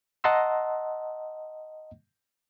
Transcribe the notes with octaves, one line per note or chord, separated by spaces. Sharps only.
D#5 F#5 A5 A#5 C6 E6